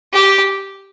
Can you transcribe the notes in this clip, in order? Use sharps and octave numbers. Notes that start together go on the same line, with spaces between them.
G4